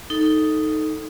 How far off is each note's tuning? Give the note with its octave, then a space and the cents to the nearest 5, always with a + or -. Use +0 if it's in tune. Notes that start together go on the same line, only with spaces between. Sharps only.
D#4 +0 A4 +0